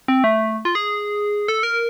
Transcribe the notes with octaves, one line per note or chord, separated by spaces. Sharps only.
C4
A3
F4
G#4
A4
A#4